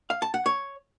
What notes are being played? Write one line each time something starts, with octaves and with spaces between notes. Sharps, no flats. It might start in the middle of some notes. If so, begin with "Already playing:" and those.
F5
A5
F#5
C#5